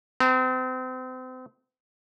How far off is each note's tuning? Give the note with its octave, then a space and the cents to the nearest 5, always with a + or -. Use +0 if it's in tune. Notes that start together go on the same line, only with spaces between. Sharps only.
C4 -35 A#5 -25